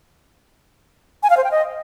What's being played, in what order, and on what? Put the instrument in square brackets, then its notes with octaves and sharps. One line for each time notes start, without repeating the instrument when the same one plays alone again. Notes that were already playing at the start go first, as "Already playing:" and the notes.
[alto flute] G#5
F5
C5
G5
D#5